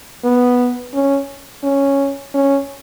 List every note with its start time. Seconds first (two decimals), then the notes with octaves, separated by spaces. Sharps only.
0.24 B3
0.94 C#4
1.63 C#4
2.34 C#4